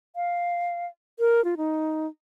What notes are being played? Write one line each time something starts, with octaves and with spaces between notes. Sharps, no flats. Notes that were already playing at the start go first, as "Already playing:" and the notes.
F5
A#4
F4
D#4